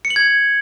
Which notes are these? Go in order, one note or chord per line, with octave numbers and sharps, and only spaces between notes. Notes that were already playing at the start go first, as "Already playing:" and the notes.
C#7
F#7
G#6